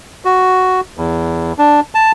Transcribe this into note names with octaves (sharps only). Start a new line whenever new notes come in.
F#4
E2
D4
A5